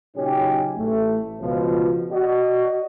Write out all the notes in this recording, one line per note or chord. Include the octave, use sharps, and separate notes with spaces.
A#2 C#3 F#3 C#4 D#4 G4
A1 A3
C#2 B2 F3
F#4 D5 D#5